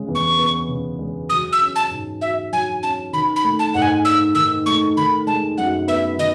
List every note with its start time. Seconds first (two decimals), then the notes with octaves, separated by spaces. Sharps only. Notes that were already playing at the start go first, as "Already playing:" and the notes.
Already playing: C#3 G#3
0.09 E2
0.15 C#6
0.39 B3
0.68 C#3
0.99 G#3
1.29 F#3 D#6
1.53 E6
1.61 C#4
1.76 A5
1.91 G#2
2.21 F#4 E5
2.52 F#3 G#5
2.83 C#4 A5
3.13 D#3 B5
3.36 B5
3.44 A3
3.59 A5
3.74 G#2 F#5
3.82 G#5
4.05 D#4 E6
4.35 D#3 E6
4.66 A3 C#6
4.97 D#3 B5
5.27 G#3 A5
5.58 F#2 F#5
5.88 B3 E5
6.18 D#3 D#5